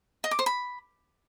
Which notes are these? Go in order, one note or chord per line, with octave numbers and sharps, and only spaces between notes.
D#5
D6
C5
B5